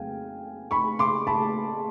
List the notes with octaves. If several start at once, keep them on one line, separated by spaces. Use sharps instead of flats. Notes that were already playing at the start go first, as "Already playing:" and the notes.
Already playing: F2 C#3 F#3 F5 G5 G#5
B5 C#6
C6 D6
A5 B5